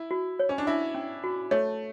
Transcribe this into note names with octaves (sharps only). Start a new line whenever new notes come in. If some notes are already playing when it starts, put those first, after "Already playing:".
Already playing: E4
F#4
C#5
C#4
D4
E4 E5
C#4
F#4
A3 C#5